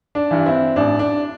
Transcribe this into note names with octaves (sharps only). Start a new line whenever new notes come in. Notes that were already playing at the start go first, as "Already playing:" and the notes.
D4
G2 E3
C4 E4
A1 D4
D4